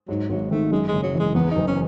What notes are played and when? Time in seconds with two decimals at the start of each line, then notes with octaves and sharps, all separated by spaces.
0.08 G#2 F#3
0.29 G#1 F#3
0.51 D#3 A3
0.71 F#2 G#3
0.88 F#1 G#3
1.03 F#3
1.14 E3
1.20 G#3
1.35 E2 B3
1.51 D#4
1.56 F#1
1.67 C#4